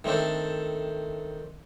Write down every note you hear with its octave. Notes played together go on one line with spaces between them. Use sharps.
D#3 A3 C4 D4 A4